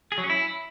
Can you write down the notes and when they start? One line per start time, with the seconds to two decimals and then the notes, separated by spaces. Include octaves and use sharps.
0.12 G#4
0.18 F#3
0.24 C#4
0.30 E4